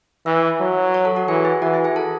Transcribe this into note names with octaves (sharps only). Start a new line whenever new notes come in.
E3 E5 E6
F#3
C#5 C#6
A4 A5
F#4 F#5
E3 G#4 G#5
E4 E5
E3 F#4 F#5
E4 E5
G#4 G#5
A4 A5